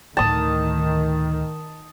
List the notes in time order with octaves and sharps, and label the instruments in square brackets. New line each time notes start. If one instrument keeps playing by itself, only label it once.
[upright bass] D2 A2 [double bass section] D#3 [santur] A5 D#6